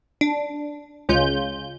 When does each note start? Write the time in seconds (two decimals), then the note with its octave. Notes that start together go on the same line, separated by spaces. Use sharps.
0.21 D4
1.09 C#2 G#3 C#4 F4 G6